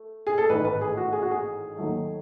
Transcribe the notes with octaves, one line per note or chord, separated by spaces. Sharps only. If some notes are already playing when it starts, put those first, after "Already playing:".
Already playing: A3
G#4
A4
A1 G#2 D#3 A3 B4
B4
G#4
F#4
G#4
F#4
G#4
D#2 D#3 F#3 A3